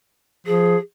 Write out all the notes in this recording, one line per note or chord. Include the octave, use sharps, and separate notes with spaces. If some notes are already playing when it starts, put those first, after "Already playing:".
F3 G#4